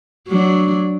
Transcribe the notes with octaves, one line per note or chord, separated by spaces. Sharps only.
F#3 D4